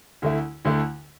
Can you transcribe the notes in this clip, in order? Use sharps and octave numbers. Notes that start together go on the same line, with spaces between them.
D2 D3 A3 E4
D2 D3 A3 E4